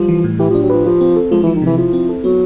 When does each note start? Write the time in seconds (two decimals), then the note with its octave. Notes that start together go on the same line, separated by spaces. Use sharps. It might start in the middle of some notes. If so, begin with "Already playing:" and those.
Already playing: F3 G3
0.08 E3
0.24 A2
0.39 E3 G4
0.50 F3
0.55 D4
0.63 F#3
0.70 F3 B4
0.85 F3 F4
1.01 C4
1.16 A4
1.31 F3 G#3
1.43 E3
1.47 F3
1.55 D#3
1.62 C3 E3
1.78 F3 E4
1.93 C4
2.09 A4
2.24 F#3 B3